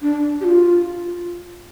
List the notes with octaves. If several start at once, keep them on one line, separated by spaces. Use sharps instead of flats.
D4
G4
F4